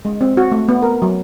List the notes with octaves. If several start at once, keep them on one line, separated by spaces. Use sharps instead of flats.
G#3
C4
F#4
A3
B3
A#4
F#3